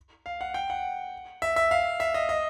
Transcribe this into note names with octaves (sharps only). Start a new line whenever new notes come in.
F5
F#5
G5
F#5
E5
E5
F5
E5
D#5
D#5